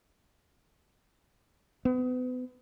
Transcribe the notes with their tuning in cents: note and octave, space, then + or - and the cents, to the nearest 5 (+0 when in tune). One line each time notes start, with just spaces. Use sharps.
B3 +35